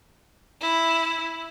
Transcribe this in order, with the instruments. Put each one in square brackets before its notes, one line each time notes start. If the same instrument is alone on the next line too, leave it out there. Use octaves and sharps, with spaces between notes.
[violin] E4